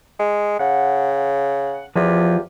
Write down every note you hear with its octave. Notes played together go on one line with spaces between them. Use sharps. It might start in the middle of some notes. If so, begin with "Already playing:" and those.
G#3
C#3 F#5
E2 F3 F4 G4